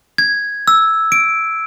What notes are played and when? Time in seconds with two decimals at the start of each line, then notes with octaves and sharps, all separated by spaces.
0.18 G#6
0.68 E6
1.12 D7